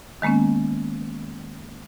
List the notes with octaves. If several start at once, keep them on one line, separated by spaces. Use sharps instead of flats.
D#3 G#3 A#3 B3 C#4